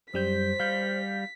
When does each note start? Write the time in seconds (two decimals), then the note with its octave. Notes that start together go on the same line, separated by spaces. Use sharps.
0.14 F#2 G3 C5 G6 B6
0.60 G3 F5 G6